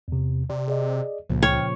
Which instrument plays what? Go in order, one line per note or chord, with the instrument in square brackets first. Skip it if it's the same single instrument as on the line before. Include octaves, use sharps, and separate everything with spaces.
[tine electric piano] E2 C3
[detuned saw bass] C3 [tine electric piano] D5
[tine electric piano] G#4 D5 D#5
[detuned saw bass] C#2 [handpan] A#2 C#3 F3
[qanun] C#5 [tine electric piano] G5 C#6 F6